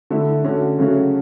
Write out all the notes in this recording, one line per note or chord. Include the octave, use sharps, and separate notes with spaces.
D3 A3 E4
D3 A3 C#4 F#4
C#3 F#3 A3 C#4 F#4